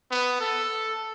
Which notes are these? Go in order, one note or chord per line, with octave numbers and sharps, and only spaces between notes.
B3
A4